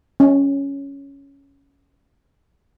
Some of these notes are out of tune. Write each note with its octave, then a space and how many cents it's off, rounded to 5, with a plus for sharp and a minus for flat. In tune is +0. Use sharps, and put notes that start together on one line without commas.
C#4 +5